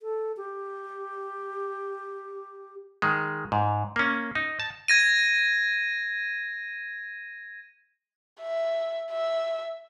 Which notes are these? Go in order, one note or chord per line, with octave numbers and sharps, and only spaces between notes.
A4
G4
D#3 G#3
G#2
A#3 C#4
D#4
A5
G#6 A#6 D#7
E5
E5